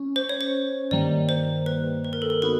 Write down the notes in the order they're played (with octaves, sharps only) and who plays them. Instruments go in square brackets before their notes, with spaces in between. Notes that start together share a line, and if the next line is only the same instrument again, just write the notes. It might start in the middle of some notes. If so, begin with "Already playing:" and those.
Already playing: [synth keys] C#4
[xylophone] C5
C#5
C5
[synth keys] G2 D#3 G3 A#3 [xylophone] D5
[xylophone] C5
B4
B4
A#4
A4
A#4
[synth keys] B3 D#4 F#4 [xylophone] B4